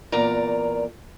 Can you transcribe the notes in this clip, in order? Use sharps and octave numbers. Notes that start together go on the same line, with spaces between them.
E2 A#2 A#4 D5 A#5